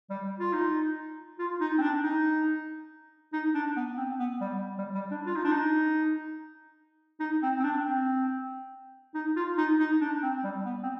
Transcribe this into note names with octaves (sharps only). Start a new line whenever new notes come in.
G3
F4
D#4
F4
D#4
C4
D4
D#4
D#4
D4
B3
C4
B3
G3
G3
G3
D4
F4
D#4
D4
D#4
D#4
C4
C4
D4
C4
D#4
F4
D#4
D#4
D4
C4
G3
B3
C4